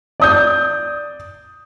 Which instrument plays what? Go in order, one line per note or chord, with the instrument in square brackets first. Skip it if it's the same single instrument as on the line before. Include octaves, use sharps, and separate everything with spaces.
[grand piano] D5 D#6 G6